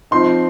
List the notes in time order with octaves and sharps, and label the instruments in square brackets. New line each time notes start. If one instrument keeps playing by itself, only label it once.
[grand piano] F3 C4 D#4 C6